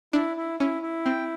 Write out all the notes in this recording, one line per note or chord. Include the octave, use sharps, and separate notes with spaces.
D4 E4
E4
C#4 E4
E4
C4 G5